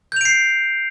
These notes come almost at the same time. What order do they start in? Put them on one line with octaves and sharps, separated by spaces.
G6 F7 D7 C7